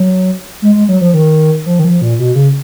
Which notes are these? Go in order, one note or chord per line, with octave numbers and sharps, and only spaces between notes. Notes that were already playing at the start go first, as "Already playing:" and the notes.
Already playing: F#3
G#3
G#3
F#3
F3
D#3
F3
D#3
F3
A#2
B2
C#3